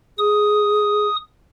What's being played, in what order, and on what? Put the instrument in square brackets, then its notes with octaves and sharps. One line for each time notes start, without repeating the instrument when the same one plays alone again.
[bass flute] G#4 [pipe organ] D#6